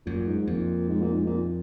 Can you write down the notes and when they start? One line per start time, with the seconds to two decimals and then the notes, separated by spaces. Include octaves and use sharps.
0.06 F#2 A#2
0.27 G#2
0.48 F2 A#2
0.89 G#2
1.02 A#2
1.15 G#2
1.27 A#2